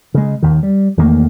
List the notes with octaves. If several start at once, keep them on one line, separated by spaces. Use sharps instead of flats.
C#3 G#3
D#2 D#3
G3
E2 D#3 A3 A#3